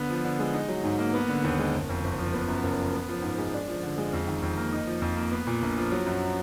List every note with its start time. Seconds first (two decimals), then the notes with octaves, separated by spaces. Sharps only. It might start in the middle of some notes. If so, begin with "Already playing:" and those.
Already playing: D3 B3
0.10 F3
0.24 D3
0.39 G#3
0.54 D#4
0.69 F#3
0.84 G#2
0.99 A#3
1.14 B3
1.29 D3
1.44 D#2
1.58 G#3
1.74 F#1
1.89 F2
2.04 F#1
2.19 F3
2.34 B3
2.48 F#2
2.64 F#1
2.78 F3
2.93 B3
3.08 F3
3.22 G#2
3.38 G#3
3.53 D4
3.68 F3
3.83 D3
3.98 G#3
4.13 F2
4.27 D#3
4.42 F2
4.57 A#3
4.72 D#4
4.87 F3
5.01 F2
5.17 A#3
5.32 B3
5.47 A#2
5.62 A#1
5.77 F3
5.92 F#3
6.06 F#2